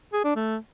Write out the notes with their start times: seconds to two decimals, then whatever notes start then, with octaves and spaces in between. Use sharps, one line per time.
0.13 G#4
0.24 D4
0.36 A3